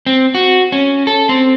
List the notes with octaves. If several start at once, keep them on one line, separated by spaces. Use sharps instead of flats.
C4
F#4
C#4
A4
C4